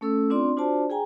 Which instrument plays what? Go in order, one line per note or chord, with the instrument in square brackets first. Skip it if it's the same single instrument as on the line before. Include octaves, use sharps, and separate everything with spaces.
[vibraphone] A3 C#4 A4 E6
C4 D4 F4 D5 C6
D4 F4 F#4 C5 D5 A5
G#4 G5 G#5 A#5